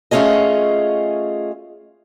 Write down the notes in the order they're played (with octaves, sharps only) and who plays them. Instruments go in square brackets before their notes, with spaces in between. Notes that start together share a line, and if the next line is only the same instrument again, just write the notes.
[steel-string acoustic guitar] A3 C#4 F4 G#4 D#5